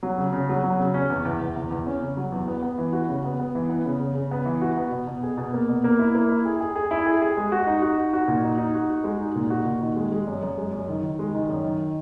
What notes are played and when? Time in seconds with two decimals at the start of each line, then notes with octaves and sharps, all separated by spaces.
0.03 F#3
0.18 C#3
0.33 C#3
0.49 F#3
0.63 F#3
0.79 C#3
0.94 C#4
1.10 E2
1.25 E2
1.41 E2
1.56 E2
1.71 E2
1.87 C#4
2.01 C#3
2.17 F#3
2.32 E2
2.48 B3
2.62 B3
2.78 E3
2.93 F#4
3.08 C#3
3.24 B3
3.40 B3
3.55 E3
3.69 B3
3.85 C#3
4.00 C#3
4.15 C#3
4.31 B3
4.46 E3
4.61 F#4
4.77 B3
4.91 B2
5.07 B2
5.23 G#4
5.37 B2
5.53 A#3
5.69 B2
5.84 A#3
5.99 E4
6.15 A#3
6.29 E4
6.45 G#4
6.60 G#4
6.76 G#4
6.91 E4
7.06 G#4
7.22 G#4
7.37 G#3
7.52 F#4
7.67 D#4
7.82 F#4
7.98 D#4
8.13 F#4
8.28 A#2
8.44 D#4
8.58 D#4
8.75 F#4
8.90 F#4
9.04 G#3
9.20 D#4
9.36 A#2
9.50 F#4
9.65 A#2
9.81 D#3
9.96 G#3
10.12 G#3
10.27 F#2
10.42 F#2
10.58 G#3
10.73 F#2
10.88 D#3
11.03 D#3
11.19 G#3
11.34 D#3
11.49 F#2
11.64 D#3